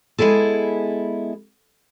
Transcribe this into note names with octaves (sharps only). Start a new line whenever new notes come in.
G#3 B3 E4 G#4 A4